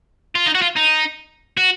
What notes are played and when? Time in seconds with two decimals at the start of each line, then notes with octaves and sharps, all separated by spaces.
0.35 F4
0.46 D#4
0.55 F#4
0.62 F4
0.77 D#4
1.57 F#4